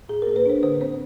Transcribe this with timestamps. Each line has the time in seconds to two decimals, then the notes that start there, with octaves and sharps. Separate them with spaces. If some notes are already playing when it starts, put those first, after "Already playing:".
0.09 A2 G#4
0.22 A#3 A#4
0.36 B4
0.46 D4 C5
0.63 D3 C5
0.81 C4 C5